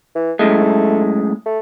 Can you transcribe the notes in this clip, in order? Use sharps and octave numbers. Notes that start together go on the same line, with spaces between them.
E3
F#2 A2 G#3 A3
A3